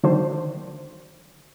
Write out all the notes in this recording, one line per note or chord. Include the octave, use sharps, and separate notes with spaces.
D3 D#3 F#3 D4 C5